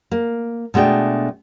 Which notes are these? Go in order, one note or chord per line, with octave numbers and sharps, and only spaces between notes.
A#3
B2 G#3 A3 D4 G5